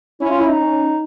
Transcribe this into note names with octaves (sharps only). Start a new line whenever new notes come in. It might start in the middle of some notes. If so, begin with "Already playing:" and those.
C#4 E4
F4
E4
D#4
C#4